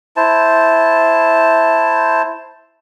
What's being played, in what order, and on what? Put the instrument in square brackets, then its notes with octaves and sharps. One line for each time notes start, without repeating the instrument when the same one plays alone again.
[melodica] E4 C5 A5